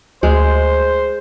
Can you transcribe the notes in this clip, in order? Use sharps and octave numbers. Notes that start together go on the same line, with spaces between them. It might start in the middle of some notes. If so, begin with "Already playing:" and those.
D2 G#3 C5